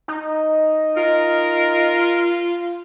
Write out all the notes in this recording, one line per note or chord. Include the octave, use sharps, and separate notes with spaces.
D#4
F4 A#4